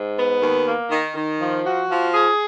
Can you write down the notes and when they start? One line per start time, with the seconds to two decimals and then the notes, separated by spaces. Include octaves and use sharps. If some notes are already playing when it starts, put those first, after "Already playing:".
Already playing: G#2
0.17 B3
0.41 D#2
0.66 A#3
0.91 D#3
1.15 D#3
1.40 F3
1.65 F#4
1.90 F3
2.14 G#4